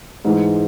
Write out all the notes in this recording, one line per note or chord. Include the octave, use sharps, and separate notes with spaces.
G#2 E3 G#3